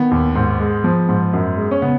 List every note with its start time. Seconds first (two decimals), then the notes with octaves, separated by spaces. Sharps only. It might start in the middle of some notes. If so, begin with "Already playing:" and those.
Already playing: D#3 B3
0.11 D#2
0.35 G#2
0.60 G#3
0.84 F3
1.08 G#2
1.33 F#2
1.57 G#3
1.71 C#4
1.82 C#3 B3